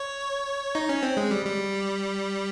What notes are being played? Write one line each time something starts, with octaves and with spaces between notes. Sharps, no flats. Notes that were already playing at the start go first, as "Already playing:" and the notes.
Already playing: C#5
D#4
C#4
C4
G#3
G3
G3